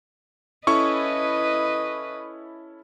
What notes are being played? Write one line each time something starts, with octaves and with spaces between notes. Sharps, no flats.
C#4 E4 A4 B4 D#5 C#6